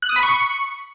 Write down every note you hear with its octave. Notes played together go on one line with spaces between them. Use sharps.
F#6
D#6
B5
C#6